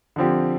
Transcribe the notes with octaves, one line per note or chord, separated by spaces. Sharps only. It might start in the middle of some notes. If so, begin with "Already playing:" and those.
D3 F3 C4 G4